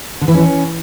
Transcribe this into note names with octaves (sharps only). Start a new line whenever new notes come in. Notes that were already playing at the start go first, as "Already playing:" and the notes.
D3
E3
C#4